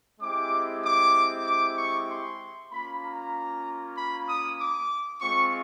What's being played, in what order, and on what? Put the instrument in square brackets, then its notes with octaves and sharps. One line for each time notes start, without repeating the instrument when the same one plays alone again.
[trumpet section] G#3 C4 E4 G4 D6
D6
D6
C#6
C6
A#3 C#4 F4 B5
A#5
B5
D#6
D6
G#3 C4 F4 C#6